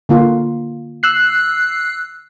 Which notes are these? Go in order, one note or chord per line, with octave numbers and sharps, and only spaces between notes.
D3 A#3 F4
E6 F#6 C7